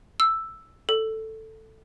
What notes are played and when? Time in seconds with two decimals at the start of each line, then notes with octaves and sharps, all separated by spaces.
0.20 E6
0.89 A4